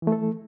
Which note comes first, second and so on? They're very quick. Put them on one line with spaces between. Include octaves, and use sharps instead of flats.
E3 A3 A4